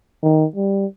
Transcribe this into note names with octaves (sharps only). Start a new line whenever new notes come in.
D#3
G3